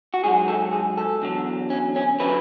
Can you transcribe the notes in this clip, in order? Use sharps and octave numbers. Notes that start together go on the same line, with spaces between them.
F#4
G#2 F#3 G#4
A4
G#4
A4
E2 D3 F#3
C#4
C#4
D3 F#3 B4